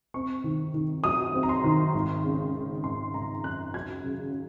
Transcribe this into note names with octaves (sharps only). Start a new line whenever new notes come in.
C4 C#6
D#3
D#3
F#3 D#6
C4
A#5
C6
D#3
G#1
C#3
C#3
G#1 C6
G#1 A#5
F#2 F#6
F#3 G#6
C#3